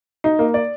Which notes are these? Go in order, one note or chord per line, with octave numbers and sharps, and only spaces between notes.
D#4
A#3
D5